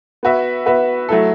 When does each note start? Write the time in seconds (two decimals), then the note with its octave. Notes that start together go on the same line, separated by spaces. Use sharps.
0.23 B3 F#4 B4 E5
0.66 B3 F#4 B4 E5
1.09 F#3 A3 E4 A4